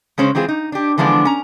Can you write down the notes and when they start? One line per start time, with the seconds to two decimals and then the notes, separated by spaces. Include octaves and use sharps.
0.18 C#3 G#3 C#4 C5
0.35 E3 G#3 C4 F4 G#4
0.48 D#4
0.72 D4 G4
0.98 D3 E3 F3 G#3 B3 D4
1.25 C#4 A#5